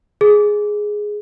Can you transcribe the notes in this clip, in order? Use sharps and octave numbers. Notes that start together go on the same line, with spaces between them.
G#4